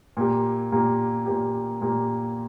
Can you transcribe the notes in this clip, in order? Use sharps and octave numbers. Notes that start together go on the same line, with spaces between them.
A#2 A#3 G4
A#2 A#3 G4
A#2 A#3 G4
A#2 A#3 G4